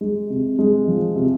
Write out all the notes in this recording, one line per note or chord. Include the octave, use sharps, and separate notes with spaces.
G#3
C3
G#3
F3
C3